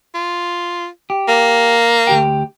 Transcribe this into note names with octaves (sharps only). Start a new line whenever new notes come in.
F4
G4
A#3
D2 G4 G5